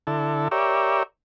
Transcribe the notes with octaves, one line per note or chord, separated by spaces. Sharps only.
D3 E4 A4
G4 A#4 C#5 D5 E5